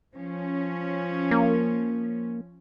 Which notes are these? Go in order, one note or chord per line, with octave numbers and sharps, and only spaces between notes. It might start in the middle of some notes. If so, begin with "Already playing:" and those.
F3 C#4
A#3